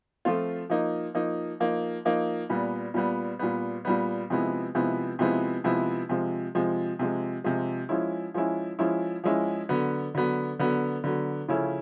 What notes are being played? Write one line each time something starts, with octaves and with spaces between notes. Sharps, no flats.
F3 A3 C4 F4
F3 A#3 D#4
F3 A#3 D#4
F3 A#3 D#4
F3 A#3 D#4
A#2 G3 B3
A#2 G3 B3
A#2 G3 B3
A#2 G3 B3
C3 F3 G#3 B3 E4
C3 F3 G#3 B3 E4
C3 F3 G#3 B3 E4
C3 F3 G#3 B3 E4
C3 F3 G#3
C3 F3 G#3
C3 F3 G#3
C3 F3 G#3
F3 G#3 C#4 E4
F3 G#3 C#4 E4
F3 G#3 C#4 E4
F3 G#3 C#4 E4
D3 F#3 B3
D3 F#3 B3
D3 F#3 B3
D3 F#3 B3
C#3 F3 A3 C#4 E4